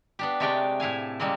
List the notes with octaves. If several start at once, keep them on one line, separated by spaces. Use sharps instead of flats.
B3 D4 G4
C3 G#3 A3 G4 D5 G5
A2 E4 F5 G#5
C#3 G3 G#3 A#3 C4